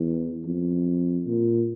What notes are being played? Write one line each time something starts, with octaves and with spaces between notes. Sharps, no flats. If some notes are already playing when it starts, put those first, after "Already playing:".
Already playing: E2
F2
A#2